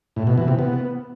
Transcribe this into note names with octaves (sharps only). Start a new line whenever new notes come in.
A2
B2
E3
C3
B3